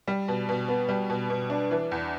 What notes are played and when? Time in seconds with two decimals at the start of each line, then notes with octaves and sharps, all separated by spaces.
0.07 G3
0.28 B2
0.49 B2
0.68 B3
0.89 G3
1.10 B2
1.30 B2
1.50 D4
1.71 E3
1.92 E2